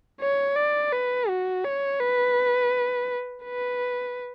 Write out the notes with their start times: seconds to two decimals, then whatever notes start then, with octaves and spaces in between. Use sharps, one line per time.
0.21 C#5
0.57 D5
0.93 B4
1.29 F#4
1.65 C#5
2.01 B4
3.45 B4